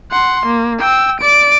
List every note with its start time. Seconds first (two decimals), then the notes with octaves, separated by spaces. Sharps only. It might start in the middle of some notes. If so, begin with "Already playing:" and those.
0.11 F#5 C6
0.46 A#3
0.80 G5 E6
1.21 D5 D7